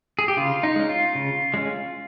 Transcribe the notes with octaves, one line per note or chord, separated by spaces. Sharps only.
G#4
G4
C#3 F4
D#4
G#3 C#4
F4
C#3
G#3 C#4